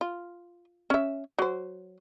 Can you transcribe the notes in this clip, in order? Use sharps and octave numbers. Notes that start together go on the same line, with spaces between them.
F4
C#4 E5
F#3 C5